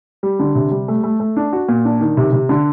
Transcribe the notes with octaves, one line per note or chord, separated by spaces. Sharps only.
G3
D3
C3
G3
A3
A3
A3
D4
F#4
A#2
D4
D#3
C3
C3
D3